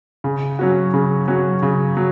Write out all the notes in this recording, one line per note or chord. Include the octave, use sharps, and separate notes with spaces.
C#3
F#3 C#4 F#4
C#3
F#3 C#4 F#4
C#3
F#3